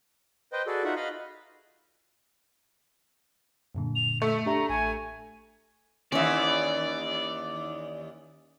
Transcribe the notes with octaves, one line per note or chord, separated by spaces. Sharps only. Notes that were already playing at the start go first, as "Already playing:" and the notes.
B4 C5 D#5 G5
F#4 G#4 A4 B4 D5
D#4 F4 F#4 E5 F#5
D#5 F5 B5
F#2 A#2 D3
F7
A3 E5
D4 G4 E5 A#5
A1 G#5
D#2 E3 C#4 D5 E5